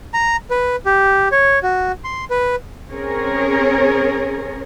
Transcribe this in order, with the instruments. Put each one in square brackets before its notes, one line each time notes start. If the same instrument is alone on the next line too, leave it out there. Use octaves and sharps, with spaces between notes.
[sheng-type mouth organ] A#5
B4
G4
C#5
F#4
C6
B4
[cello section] C4 C#4 G#4 A#4 C#5